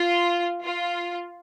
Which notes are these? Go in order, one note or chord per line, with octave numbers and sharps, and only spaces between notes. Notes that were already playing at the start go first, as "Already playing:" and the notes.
Already playing: F4
F4